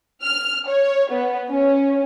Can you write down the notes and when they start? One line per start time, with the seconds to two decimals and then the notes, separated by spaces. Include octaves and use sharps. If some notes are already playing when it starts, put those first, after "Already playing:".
0.23 F6
0.68 C#5
1.11 B3
1.49 C#4